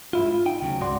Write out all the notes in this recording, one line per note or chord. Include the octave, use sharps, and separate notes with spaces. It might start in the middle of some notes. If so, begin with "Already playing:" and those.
G#2 E4 F4
F4
D#4 G5
D2 C#3 F#3
C#2 G#2 F#4 D5 C6